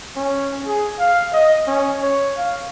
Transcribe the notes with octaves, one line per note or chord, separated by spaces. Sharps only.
C#4
G#4
F5
D#5
C#4
C#5
F5